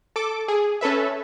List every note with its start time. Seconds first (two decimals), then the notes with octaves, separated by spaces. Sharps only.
0.16 A4 D6
0.48 G#4
0.81 C#4 A4 B4 E5